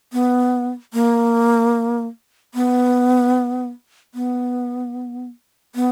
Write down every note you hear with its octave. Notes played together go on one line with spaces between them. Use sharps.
B3
A#3
B3
B3
B3